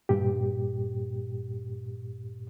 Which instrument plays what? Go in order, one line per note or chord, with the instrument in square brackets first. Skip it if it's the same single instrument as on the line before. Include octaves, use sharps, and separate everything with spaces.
[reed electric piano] G2 A#2 G4